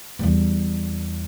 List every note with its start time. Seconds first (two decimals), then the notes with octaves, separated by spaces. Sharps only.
0.19 E2 G3